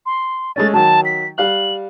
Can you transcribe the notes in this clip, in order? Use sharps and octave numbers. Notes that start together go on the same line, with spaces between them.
C6
G#3 A3 C#4 A6
D#3 F#3 A5
B6
G3 F5 F#6 F#7